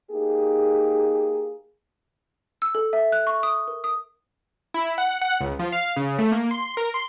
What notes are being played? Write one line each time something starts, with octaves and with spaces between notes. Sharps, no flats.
A#3 D#4 G4 G#4
E6
A4
E5
F#6
C#6
D#6
A#4
D#6
E4
F#5
F#5
C#2
F3
F5
C#3
A3
A#3
C6
A#4
C6